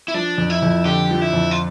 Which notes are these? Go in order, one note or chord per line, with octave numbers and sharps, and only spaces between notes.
E4
F3 D4
F2
E4
F2
D3 G4
F3
E4
F2
F4